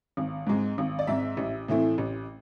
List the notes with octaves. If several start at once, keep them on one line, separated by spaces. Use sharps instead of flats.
G#1
G#2 G#3 C4
G#1
D5
G#2 G#3 C4 E5
A1
A2 E3 A3 C4
A1